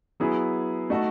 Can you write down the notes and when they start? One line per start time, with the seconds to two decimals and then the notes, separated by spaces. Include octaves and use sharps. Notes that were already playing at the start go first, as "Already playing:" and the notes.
0.20 F#3 B3 E4 G#4
0.90 A3 D#4 F#4 A4